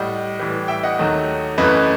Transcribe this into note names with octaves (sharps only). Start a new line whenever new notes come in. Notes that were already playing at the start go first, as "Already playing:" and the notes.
Already playing: A2 G3 D#5 F#5
A2 E3 G3
E5 G5
D#5 F#5
D#2 D#3 F#3 A3
F#2 E3 A3 B4 D#5